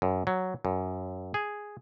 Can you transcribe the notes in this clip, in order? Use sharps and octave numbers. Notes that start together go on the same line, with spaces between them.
F#2
F#3
F#2
G#4